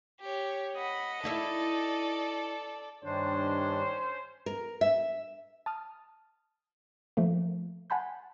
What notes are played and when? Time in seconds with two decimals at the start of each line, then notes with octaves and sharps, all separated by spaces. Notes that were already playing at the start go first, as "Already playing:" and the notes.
0.21 G4 C#5
0.76 D#5 F#5 B5
1.24 D#4 E4 A4 D5 E5
3.04 G2 D#3 C#4 D4 C5 C#5
4.46 A#4
4.81 E5
5.66 A5 D#6 F6
7.17 F3 A3 A#3
7.90 F#5 G#5 A5 B5 C6 G6